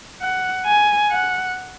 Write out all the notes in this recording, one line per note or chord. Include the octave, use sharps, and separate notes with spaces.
F#5
G#5
F#5